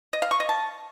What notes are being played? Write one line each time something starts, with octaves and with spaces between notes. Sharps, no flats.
D#5
F5
C#6
D#5
A5